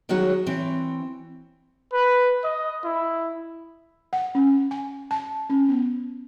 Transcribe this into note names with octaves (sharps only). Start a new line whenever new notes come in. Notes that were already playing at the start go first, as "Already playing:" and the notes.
D#3 F#3 G#3 C#4 F#4 C#5
E3 C4 C#5
B4
D#5
E4
F#5
C#4
G#5
A5
C#4
B3